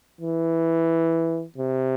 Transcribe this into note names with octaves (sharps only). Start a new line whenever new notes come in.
E3
C3